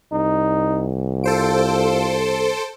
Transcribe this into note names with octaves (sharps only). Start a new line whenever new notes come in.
C2 D#4
F4 A4 C5 D7